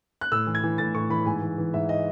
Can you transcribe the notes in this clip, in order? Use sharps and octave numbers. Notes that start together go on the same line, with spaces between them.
F#6
A2 E6
E3
G#6
E3
A2 A6
A2 C#6
E3 B5
G#2 G#5
E3
E3
G#2 E5
D#5